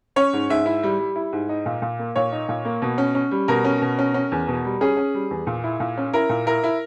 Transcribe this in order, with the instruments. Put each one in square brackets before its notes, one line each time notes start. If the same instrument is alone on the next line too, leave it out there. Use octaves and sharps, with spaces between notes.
[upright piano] C#4 C#5
G#2
G#2 E5
E4
G3
G3
E4
G#2
D#4
A#2
A#2
A#3
A#2 C#5
D#4
A#2
A#3
B2
C#4
C#4
G3
B2 A#4
C#4
B2
C#4
C#4
E2
B2
G3
C#4 G#4
C#4
G3
E2
A#2
E4
A#2
C#4
E4 A#4
A#2
E4 A#4
E4